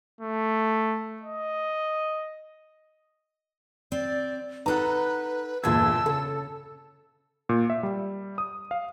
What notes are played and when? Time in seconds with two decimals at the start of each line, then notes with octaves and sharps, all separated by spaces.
0.21 A3
1.22 D#5
3.92 C4 D5
4.66 D#4 A4 B4 F#5 A#5 F#6
5.64 G1 E2 A#2 G#3 A5 E6 G#6
6.06 C#3 A4
7.49 A#2
7.70 E5
7.83 G3
8.38 D#6
8.71 F5